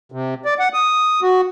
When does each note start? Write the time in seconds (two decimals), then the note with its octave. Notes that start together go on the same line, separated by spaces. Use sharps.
0.12 C3
0.45 D5
0.59 F#5
0.74 D#6
1.22 F#4